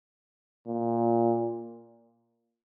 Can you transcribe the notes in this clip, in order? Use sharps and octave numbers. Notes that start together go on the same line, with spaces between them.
A#2